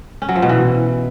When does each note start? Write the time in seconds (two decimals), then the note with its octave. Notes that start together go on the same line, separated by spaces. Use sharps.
0.22 C#4
0.29 F#3
0.36 F3
0.42 B2
0.49 E3